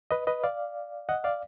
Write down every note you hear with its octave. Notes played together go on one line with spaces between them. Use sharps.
B4 D#5
B4 D#5
D5 F5
D#5 F#5
D5 F5